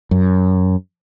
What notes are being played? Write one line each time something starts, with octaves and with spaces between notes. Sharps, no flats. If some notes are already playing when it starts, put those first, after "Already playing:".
F#2